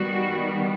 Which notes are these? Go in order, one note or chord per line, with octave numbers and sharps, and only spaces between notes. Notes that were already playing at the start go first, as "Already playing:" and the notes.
Already playing: D#3 G3 B3 F#4